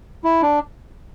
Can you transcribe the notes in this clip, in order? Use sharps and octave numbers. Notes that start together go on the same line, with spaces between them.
E4
D4